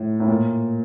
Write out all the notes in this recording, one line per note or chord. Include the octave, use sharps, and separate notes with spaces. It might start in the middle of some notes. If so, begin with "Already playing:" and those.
Already playing: A2
A2
A#2